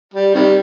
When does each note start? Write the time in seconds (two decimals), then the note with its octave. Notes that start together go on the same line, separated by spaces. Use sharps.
0.14 G3
0.34 C3 D#3 G3